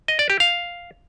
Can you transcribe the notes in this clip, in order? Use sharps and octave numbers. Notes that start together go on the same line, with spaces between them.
D#5
D5
G4
F5